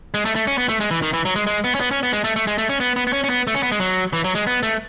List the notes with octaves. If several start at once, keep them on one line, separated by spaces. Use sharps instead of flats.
G#3
A3
A3
C#4
B3
A3
G#3
E3
D#3
E3
F#3
G#3
G#3
B3
C#4
B3
C#4
B3
G#3
A3
A3
G#3
A3
C#4
B3
B3
B3
C#4
C#4
B3
A3
C#4
B3
G#3
F#3
E3
F#3
G#3
B3
A3